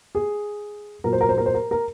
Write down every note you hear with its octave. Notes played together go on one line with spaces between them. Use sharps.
G#4
A#2 F#3 A#4
C5
A#4
C5
A#4
C5
A#4
A#4